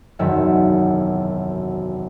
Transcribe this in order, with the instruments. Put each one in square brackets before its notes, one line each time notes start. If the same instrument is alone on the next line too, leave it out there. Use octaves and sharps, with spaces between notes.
[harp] E1 C2 F#2 D#3 E5